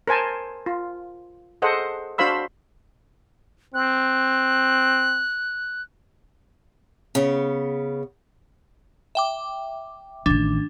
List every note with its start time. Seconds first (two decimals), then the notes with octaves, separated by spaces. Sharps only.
0.08 A#4 C5 G#5 A5
0.66 F4
1.62 G#4 A4 C5 D#5 F#5
2.18 D4 F#4 C5 F5 B5 E6
3.74 C4 F#6
7.15 C#3 B3
9.15 E5 G5 D6
10.26 A1 D#3 D4